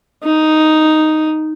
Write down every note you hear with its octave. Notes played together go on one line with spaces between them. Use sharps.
D#4